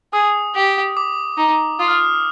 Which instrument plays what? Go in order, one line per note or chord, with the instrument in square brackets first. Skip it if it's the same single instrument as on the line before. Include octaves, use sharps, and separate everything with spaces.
[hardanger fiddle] G#4 [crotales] D#6
[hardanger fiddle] G4
[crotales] D6
[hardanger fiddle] D#4
[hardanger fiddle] F4 [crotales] D#6
[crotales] F6
D#6